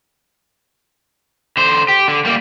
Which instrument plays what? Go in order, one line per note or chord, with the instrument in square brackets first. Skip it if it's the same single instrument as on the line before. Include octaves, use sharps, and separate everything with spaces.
[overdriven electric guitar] D3 C5
G4
D3
G3 A#3